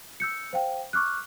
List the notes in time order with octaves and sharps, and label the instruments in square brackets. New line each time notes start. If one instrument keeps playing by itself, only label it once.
[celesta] E6 G6 C#7
C5 F5 G5
C#6 D6 F6 F#6